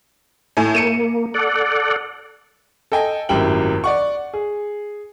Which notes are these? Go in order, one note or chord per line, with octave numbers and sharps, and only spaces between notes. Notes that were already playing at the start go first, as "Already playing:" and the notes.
A2 G#5
A#3 C#7 D#7 E7
A4 D5 F#5
A4 D#5 G5 G#5
G#1 F#2 A2 G4 G5 F#7
D5 F#5 C#6
G#4